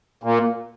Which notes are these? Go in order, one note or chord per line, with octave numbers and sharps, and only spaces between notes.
A#2